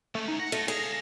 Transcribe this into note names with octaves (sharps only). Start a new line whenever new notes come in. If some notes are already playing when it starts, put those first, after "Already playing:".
G#3 A3 C#4
D#4
F#5 A#6
A3 F4 B4
G#3 G#4 F5